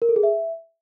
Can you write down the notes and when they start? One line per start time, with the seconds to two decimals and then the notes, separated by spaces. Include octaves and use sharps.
0.02 A#4
0.09 A4
0.16 G#4
0.23 E5